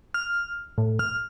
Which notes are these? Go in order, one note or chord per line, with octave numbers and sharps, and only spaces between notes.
F6
A2
F6